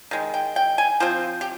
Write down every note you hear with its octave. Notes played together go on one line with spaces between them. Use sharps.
D#3 G#3
G5
G5
G#5
F3 C4 C5
G4